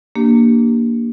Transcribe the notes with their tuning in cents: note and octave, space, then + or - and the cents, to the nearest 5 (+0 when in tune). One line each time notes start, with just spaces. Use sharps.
A#3 +0 D4 +0 G4 -5